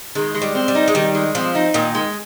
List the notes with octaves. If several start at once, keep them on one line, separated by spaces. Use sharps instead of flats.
D#3 G#3
G#3
G3
C4
G3
D#4
G#3
D#3 G3
G#3
F3 C4
D#4
A#2 D#3
G#3